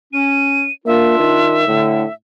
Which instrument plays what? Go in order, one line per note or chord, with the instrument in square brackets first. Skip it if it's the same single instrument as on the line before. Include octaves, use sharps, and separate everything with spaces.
[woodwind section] C#4 [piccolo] D#7
[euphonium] A#3 [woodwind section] D4 F4 [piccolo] E5
[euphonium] D#3
[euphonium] A2 [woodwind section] D3